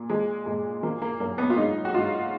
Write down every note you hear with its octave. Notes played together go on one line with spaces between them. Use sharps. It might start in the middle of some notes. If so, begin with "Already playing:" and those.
Already playing: A#2
F3 G#3
A#2 G#3
F3 A#3
A#3
F#2 A#3
B3
F4
G#2 D#4
F#4
G#2 F4